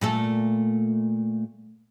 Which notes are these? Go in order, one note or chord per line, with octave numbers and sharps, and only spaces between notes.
A#2 A3 A4